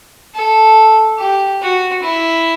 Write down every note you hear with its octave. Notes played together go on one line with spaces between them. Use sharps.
A4
G4
F#4
E4